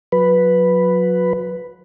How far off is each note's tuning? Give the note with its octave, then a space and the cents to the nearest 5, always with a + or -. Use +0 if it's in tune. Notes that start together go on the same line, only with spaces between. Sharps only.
F#3 -35 B4 +0